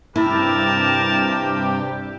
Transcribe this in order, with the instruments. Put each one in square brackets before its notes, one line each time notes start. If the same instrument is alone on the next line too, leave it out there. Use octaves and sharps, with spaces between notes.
[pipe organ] G2 C3 G4 [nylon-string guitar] E4 [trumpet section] A#4 A5